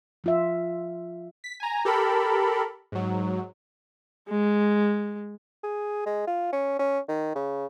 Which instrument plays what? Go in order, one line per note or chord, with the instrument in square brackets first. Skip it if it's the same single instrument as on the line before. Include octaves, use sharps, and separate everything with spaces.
[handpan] F3 F4 E5
[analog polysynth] B6
G#5 A#5
G4 A4 A#4 B5
G#2 F#3
[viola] G#3
[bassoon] G#4
G#3
F4
C#4
C#4
D#3
C#3